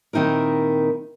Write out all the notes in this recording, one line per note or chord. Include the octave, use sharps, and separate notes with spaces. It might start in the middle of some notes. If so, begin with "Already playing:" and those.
A#2 D#3 C4 D#4 E4 A#4